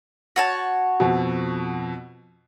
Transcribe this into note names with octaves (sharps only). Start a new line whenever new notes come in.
F#4 C#5 A5
F2 B2